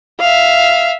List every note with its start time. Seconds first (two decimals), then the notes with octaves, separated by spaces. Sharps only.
0.20 E5 F5